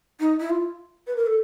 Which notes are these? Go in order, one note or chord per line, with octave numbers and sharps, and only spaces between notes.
D#4
E4
F4
B4
A#4
A4